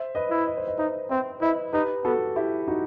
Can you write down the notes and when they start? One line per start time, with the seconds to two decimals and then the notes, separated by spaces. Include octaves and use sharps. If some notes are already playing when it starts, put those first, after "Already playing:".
Already playing: C5 E5
0.15 B4 D#5
0.30 E4
0.47 D#5
0.57 C5
0.67 B4 D#5
0.78 D#4 C5 E5
1.10 C4 C5 E5
1.41 E4 B4 D#5
1.73 D#4 G4 B4
2.04 B3 F#4 A4
2.36 E4 G4
2.68 D#4 F#4